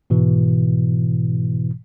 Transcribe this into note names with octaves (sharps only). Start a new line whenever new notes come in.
G#2 B2 E3